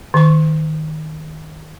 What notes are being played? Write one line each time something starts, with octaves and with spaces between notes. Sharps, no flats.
D#3 C#6